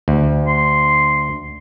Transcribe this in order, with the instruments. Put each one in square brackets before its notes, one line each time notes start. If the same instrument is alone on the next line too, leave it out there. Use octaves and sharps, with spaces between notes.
[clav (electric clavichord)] D2
[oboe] C6